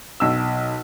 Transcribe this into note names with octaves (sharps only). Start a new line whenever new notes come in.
B1 E6